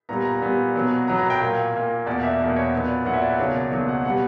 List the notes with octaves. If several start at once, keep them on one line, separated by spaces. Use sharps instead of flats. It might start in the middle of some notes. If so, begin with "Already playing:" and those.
A#2 G3 B3 A#5
A#5
A#2 G3 B3
B2 F#3 B3
B2 F#3 B3 A#5
A#5
G5
A#2 A#3
A#2 A#3
E2 B2 A#3 D5
E5
E2 B2 A#3
C#5
A#2 F#3 B3
D5
A#2 F#3 B3 F#5
E5
D5
B4
C#2 B2 F#3 A#3 C#5
D5
C#2 B2 F#3 A#3
F#5
B2 G3 B3 F#5